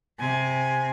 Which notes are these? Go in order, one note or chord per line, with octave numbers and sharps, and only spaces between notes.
C3 G#5